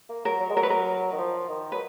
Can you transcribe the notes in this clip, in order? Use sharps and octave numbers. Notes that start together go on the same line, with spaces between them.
A#3
F#3 A#4
F#3
G#3
F#3 A#4
B4
A#4
D#3
F3
D#3
F#3 B4